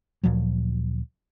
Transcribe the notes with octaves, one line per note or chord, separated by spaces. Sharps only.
D2 A#2 F3 F#3